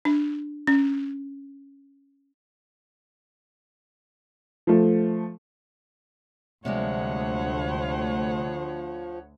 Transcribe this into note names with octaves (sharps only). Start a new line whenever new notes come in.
D4
C#4
F3 A3
D2 C3 F3 G3 G#3 C#5 F#5